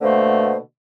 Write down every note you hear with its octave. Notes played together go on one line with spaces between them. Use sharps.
B2 D3 A3 A#3 C5